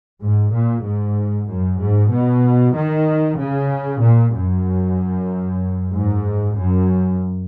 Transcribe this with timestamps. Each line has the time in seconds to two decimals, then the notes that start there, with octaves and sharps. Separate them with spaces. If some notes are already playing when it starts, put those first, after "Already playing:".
0.23 G#2
0.54 A#2
0.86 G#2
1.49 F#2
1.81 G#2
2.12 B2
2.76 D#3
3.39 C#3
4.02 A#2
4.35 F#2
5.92 G#2
6.56 F#2